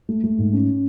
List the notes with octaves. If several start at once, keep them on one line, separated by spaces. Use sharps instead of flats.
A3
A3
G#2
C#4